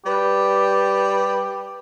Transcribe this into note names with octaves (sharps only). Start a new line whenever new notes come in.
G3 G4 B4